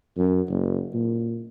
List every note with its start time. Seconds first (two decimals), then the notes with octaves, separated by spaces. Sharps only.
0.18 F#2
0.49 F#1
0.93 A#2